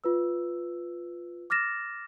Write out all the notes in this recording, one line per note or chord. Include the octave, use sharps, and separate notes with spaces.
F4 B4 E6
D6 F6 A6 A#6 E7